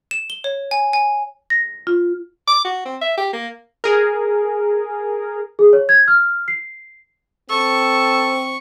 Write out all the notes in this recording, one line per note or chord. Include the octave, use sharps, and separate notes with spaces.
E7
G7
C#5
G#5
G#5
A#6
F4
D6
F#4
C4
E5
G4
A#3
G#4 A#4
G#4
C#5
G#6
F6
C7
C4 A4 C#6